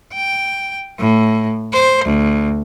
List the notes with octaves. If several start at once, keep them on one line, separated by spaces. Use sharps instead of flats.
G5
A2
C5
D2